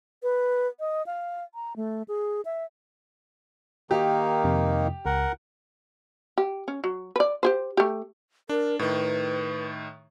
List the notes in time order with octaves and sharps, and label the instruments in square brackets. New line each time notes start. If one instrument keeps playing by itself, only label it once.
[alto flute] B4
D#5
F5
A#5
A3
G#4
E5
[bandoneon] D#3 A#3 D#4 [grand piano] G4
[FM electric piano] F2 C3
[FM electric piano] C#2 [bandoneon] A#4 F#5
[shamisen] G4
C#4
F#3
B4 D5
G4 G#4 C5
A3 G4
[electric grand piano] D4 [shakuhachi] A#4
[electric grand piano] A2 D#3 [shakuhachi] B4